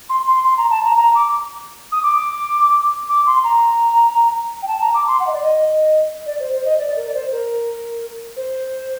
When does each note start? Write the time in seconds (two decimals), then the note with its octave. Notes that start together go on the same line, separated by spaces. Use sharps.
0.09 C6
0.27 C6
0.44 C6
0.57 A#5
0.70 A5
0.84 A#5
0.97 A#5
1.15 D6
1.92 D#6
2.03 D6
3.09 D6
3.26 C6
3.44 A#5
4.62 G5
4.68 A5
4.80 A#5
4.94 D6
5.07 C6
5.20 F#5
5.27 D#5
5.33 D5
5.41 D#5
6.26 D5
6.39 C5
6.52 C5
6.64 D#5
6.78 D5
6.96 A#4
7.07 D5
7.14 C5
7.31 A#4
8.36 C5